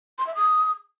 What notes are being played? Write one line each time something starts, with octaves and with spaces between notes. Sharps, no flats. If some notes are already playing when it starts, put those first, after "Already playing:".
C6
E5
D#6